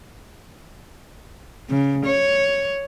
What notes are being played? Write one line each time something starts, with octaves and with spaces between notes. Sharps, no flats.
C#3
C#5